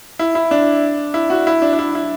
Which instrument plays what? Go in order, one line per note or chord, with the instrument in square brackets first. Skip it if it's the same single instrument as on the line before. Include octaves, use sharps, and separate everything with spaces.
[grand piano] E4
E4
D4
E4
F#4
E4
D4
D4
E4
E4